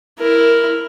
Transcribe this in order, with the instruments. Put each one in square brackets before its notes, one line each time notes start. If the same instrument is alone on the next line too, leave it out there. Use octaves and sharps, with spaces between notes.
[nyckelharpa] E4 A#4